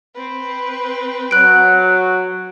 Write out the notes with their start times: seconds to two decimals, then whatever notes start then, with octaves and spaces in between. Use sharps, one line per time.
0.15 C4 B4
1.31 F#3 F#6 D7